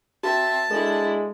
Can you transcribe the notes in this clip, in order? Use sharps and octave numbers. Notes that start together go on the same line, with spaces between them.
C4 F#4 E5 A5
G#3 D4 E4 A4